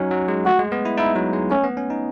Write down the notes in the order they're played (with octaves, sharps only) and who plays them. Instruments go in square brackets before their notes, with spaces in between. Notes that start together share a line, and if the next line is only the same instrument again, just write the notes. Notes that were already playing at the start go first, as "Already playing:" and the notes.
Already playing: [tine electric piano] F#3 C#4 D#4 F#4
F#3
G#3
[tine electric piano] A3 [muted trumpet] F#4
[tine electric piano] G#3
B3
E4
[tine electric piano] D#4 [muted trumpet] E4
[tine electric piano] F#3
G#3
[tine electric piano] A3 [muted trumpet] C#4
[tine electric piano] B3
C#4
D#4